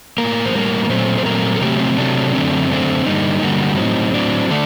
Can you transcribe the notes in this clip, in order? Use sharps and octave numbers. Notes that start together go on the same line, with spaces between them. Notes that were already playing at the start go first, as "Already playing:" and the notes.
A2 G3 A#3 A#4
C5
A2 G3 A#3 A#4
A#4
A#2 F#3 A3 C4 C5
C5
A#2 F#3 A3 C4 A#4
A4
C3 F#3 A3 C4 G4
C4
C3 F#3 A3 C4 D4
F#2 D3 A3 C4
F#2 D3 A3 C4
G2 D3 G3 A#3 D#4
G2 D3 G3 A#3 F#4
A2 F#3 C4 D#4
A2 F#3 C4 D4
D3 A3 D4